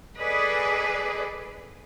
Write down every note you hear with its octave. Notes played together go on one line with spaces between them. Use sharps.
G#4 A4 B4 D5 D#5